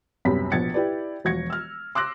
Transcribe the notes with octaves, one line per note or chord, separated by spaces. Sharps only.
C2 F#2 C3 B3 B5 B6
A#1 B2 B3 G#6 A6 C#7
E4 G4 B4 D5
E1 F3 F#4 G#6 A#6 C#7
E6 F6
C6 D6 E6 F#6 A#6